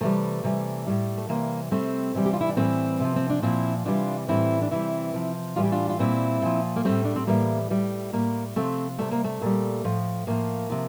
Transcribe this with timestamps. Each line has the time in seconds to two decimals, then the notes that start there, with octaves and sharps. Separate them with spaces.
0.01 C3 E3 G3 A3
0.44 C3 E3 G3
0.87 A2 G3
1.17 A3
1.29 C3 E3 G3 A#3
1.71 C3 G3 A3 C4
2.14 C3 E3 G3
2.25 G4
2.33 F4
2.41 E4
2.49 D4
2.57 A2 E3 G3 A3 C4
3.00 C3 F3
3.16 C4
3.30 D4
3.43 A#2 F3 C4 E4
3.85 C3 E3 G3 D4 F4
4.28 A2 E3 G3 C4 E4
4.62 D4
4.71 C3 E3 G3 C4 E4
5.14 C3 F3
5.56 A2 E3 G3 F4
5.64 G4
5.72 D4 F4
5.89 F4
5.99 A#2 G3 C4 E4
6.42 A#2 F3
6.76 A#3
6.85 A2 G3 A3 C4
7.04 D4
7.16 C4
7.27 A2 E3 G3 A#3
7.70 A2 G3
8.13 A2 G3 A#3
8.56 C3 F3 A3 C4
8.98 C3 G3 A3
9.11 A#3
9.24 A3
9.41 A#2 G3
9.85 A2 F3
10.27 A2 F3 A#3
10.70 C3 F3